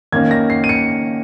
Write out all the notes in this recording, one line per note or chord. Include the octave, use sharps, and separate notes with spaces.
D#3 A#3 C#4 G#6
A#6
C7
D#7
C#7